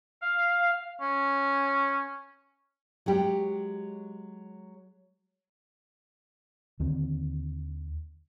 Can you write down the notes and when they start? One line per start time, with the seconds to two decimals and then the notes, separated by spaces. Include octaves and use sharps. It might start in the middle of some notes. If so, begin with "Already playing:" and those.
0.22 F5
1.01 C#4
3.06 F#3 G#3 G4
6.80 D#2 D3 D#3 C4